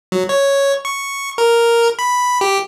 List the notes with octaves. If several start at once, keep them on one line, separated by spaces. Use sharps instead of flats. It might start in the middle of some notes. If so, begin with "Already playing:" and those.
F#3
C#5
C#6
A#4
B5
G4